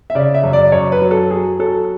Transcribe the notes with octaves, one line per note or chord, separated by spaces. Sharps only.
E5
C#3 D5
E5
F#2
D5
F#2 C#5
B4
F#3
A4
F#3 G#4
F#3 A4